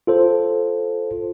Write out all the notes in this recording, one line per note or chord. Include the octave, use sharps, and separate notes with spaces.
F4 A4 C5